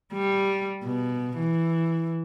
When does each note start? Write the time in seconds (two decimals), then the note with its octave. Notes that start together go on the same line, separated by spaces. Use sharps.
0.13 G3
0.84 B2
1.38 E3